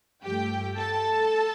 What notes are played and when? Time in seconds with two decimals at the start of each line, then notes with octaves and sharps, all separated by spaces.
0.24 G2 F3 A3 G4 G5
0.77 A4 A5